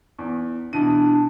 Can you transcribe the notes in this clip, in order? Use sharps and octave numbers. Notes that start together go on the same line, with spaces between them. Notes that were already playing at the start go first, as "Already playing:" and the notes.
E2
B2 E3 D4 D#7